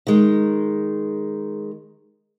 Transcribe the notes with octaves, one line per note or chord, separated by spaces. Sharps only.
D#3 G#3